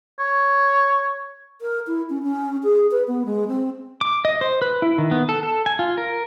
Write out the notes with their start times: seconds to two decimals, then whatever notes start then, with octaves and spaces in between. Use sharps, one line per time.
0.20 C#5
1.61 A#4
1.87 E4
2.10 C#4
2.23 C#4
2.63 G#4
2.91 B4
3.08 B3
3.25 G#3
3.48 C4
4.01 D6
4.25 D#5
4.41 C5
4.62 B4
4.82 E4
4.98 D#3
5.11 B3
5.29 A4
5.43 A4
5.66 G#5
5.79 F4
5.98 A#4